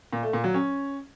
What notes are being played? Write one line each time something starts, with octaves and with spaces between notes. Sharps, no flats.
A#2
A3
A#2
F#3
C#4